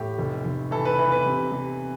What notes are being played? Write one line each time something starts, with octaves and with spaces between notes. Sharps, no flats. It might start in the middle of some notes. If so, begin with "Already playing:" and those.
Already playing: A2 G4
F1
F1
E3 A4
B4
E3 B4
B4
C3
C3